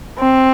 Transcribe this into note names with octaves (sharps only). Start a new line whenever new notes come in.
C4